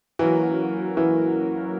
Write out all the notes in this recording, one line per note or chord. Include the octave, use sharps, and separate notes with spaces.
E3 F#3 A#3 C#4 F#4 A#4
E3